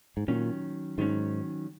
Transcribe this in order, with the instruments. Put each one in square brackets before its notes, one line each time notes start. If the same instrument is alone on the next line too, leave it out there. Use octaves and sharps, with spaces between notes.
[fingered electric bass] G#2
[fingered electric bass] A#2 [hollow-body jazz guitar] D#3 F#3 C#4
[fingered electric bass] G#2 [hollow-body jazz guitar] D#3 F#3 C#4